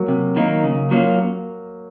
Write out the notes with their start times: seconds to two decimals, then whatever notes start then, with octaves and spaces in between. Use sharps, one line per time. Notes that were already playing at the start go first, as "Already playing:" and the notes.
Already playing: F#3 A#3
0.08 C3
0.36 D#3 A#3 D#4
0.64 C#3
0.91 F#3 A#3 C#4 F4